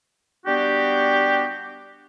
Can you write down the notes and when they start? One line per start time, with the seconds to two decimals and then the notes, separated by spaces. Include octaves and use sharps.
0.46 G3 B3 D4 F#4 G4